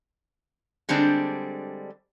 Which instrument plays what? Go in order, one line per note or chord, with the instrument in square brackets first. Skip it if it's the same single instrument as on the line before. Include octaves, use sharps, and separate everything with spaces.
[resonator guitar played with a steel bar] D3 G3 G#3 C4 D4